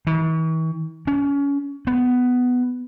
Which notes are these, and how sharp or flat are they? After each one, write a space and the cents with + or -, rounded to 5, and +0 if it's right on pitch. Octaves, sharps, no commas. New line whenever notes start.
E3 -45
C#4 +25
B3 +5